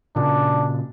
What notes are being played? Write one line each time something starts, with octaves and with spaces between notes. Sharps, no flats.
A#2 C#3 D4